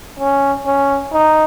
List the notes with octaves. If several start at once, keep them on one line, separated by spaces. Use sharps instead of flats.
C#4
C#4
D#4